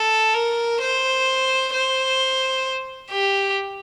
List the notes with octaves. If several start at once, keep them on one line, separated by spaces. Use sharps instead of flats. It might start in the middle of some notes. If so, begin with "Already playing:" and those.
Already playing: A4
A#4
C5
C5
G4